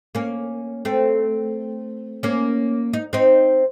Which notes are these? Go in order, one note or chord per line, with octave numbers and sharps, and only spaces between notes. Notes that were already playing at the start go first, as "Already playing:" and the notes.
A#3 C#4
A3 C4
A#3 C#4
D#4
C4 D#4